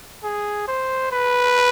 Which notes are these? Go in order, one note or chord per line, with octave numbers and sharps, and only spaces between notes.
G#4
C5
B4